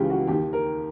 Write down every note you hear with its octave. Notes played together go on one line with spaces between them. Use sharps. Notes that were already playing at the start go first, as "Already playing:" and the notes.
Already playing: C#2 C#3 E3 G4
F#4
D#2 D#3 G4
A#4